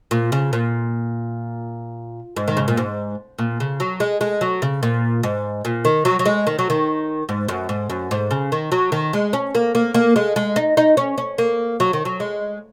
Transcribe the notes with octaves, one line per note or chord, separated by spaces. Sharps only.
A#2
C#3
A#2
G#2
D#3
C#3
A#2
G#2
A#2
C#3
F#3
G#3
G#3
F#3
C#3
A#2
G#2
A#2
D#3
F#3
F#3
G#3
D#3
F#3
D#3
G#2
F#2
G#2
F#2
G#2
C#3
D#3
F#3
D#3
G#3
C#4
A#3
A#3
A#3
G#3
G#3
D#4
D#4
C#4
C#4
A#3
F#3
D#3
F#3
G#3